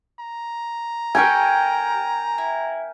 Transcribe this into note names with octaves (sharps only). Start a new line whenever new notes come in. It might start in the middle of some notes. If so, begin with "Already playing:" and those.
A#5
G4 A4 A#4 G5 G#5 C#6
E4